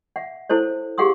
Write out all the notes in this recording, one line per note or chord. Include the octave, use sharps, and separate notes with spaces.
E5 F#5
E4 A4 C5 C#5
G4 G#4 F5 F#5 C6 D#6